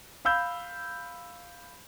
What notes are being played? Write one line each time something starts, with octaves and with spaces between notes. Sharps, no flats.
F5 B5 E6 G6